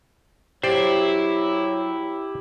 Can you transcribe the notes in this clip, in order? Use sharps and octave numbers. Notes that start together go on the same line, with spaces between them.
F#3 E4 G4 C5 D5